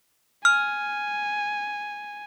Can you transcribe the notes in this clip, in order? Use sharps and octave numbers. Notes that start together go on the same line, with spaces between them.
G#5 F6